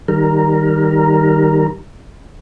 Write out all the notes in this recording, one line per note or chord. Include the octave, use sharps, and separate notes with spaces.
D#3 G3 A#4